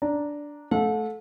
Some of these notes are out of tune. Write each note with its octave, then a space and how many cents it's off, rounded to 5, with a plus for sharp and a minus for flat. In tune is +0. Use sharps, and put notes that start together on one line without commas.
D4 -5 A#5 -5
A3 -15 A4 -15 F#5 -45